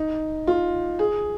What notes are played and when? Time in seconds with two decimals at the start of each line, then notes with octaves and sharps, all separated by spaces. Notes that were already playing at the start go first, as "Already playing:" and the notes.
Already playing: D#4
0.47 F4
0.99 G#4